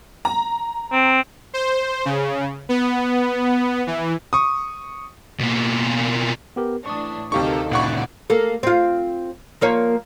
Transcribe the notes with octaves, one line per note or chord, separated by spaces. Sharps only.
A#5
C4
C5
C#3
B3
E3
C#6 D#6
B2 A#3
B3 G4 A#4
A2 E3 D4 C#6 D#6
D2 C3 D#3 D#4 G4 A4 F5 C#6
G1 A#2 C#3 E4 D5 F#5 C#6
A#3 A4
C4 F4
F3 A#3 C#5